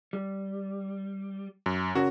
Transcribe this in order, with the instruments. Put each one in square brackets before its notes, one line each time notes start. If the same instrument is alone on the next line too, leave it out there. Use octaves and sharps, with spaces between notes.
[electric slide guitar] G3
[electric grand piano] F#2
[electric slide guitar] C#3 C#4 A#4 [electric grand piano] F#4